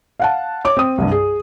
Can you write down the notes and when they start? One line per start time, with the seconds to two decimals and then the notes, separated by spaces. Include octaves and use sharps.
0.20 F5 F#5 A5
0.65 C#5 D6
0.77 C4 D#6
0.98 C2 G2
1.11 G#4